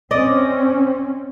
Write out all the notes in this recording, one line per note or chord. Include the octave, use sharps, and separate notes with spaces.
C4 C#4 D5 D#5